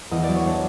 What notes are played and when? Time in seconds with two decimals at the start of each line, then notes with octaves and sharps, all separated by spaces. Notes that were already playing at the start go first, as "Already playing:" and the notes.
0.11 E2 D#5
0.23 F#3 D5
0.35 C#5
0.45 F#3 D4 D5